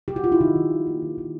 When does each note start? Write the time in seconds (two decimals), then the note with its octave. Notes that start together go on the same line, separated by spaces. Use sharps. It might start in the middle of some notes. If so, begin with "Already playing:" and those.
0.08 G4
0.16 F#4
0.24 F4
0.32 E4
0.41 D#3 D#4
0.56 D#3
0.72 G3
0.87 A#3
1.02 D#3
1.18 D#3